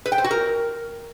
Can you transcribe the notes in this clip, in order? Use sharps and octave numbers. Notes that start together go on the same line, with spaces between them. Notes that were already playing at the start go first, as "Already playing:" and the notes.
B4
G5
C5
F#4
A#4